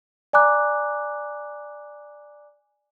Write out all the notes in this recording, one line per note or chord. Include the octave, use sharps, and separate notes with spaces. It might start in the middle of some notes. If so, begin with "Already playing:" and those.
D5 G#5 A#5 D6 F#6